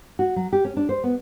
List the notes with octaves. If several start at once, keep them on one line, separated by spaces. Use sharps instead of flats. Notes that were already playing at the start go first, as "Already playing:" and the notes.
F#4
F#3
G4
C#4
D4
C5
B3